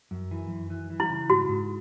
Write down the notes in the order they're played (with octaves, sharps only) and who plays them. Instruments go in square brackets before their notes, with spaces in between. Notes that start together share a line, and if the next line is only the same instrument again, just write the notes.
[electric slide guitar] F#2
E3
F#2
E3
E3
[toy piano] E4
[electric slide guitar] C#3
[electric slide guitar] G#2 [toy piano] F#4
[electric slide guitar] G#2